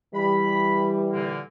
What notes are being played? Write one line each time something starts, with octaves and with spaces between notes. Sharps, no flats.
E3 G3 B5
A#2 D3 A#3